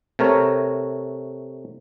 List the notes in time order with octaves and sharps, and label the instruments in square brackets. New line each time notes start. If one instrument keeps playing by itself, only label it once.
[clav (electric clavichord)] C3 A3 A#4 C#5